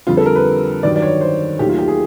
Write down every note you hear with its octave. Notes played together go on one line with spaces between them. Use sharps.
F2 D3 G3 F4
A4
A#4
B4
G2 D#3 F#3 D5
D5
C#5
C5
D#2 D#3 F#3 A3 G4
F4
G4
G#4